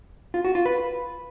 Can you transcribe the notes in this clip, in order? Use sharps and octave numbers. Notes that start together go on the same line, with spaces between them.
F4
F#4
F4
B4